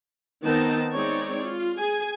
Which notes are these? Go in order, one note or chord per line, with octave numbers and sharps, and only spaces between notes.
D#3 B3 C4 D#4 A5
G#3 C4 D#4 C#5 D5
F4
G#4 G#5